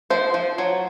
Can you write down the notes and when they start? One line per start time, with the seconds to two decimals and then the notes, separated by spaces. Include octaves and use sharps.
0.10 F3 C5
0.34 F3
0.58 F#3